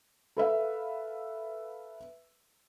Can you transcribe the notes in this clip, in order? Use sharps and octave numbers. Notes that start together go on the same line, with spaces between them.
A4 B4 E5 F5